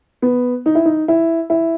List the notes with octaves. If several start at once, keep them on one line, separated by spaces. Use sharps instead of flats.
B3
D#4
E4
D#4
E4
E4